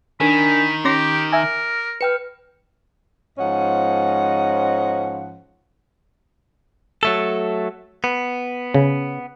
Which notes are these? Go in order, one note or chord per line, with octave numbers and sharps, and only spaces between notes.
D#3 D4 A#4 G#5 B5
C#4 G4 C6 D6 A#6
A#4 E5 G#5
B4 G5 F6 C#7
G#2 F3 C#4 D#5 F#5
F#3 A3 A4
B3
C#3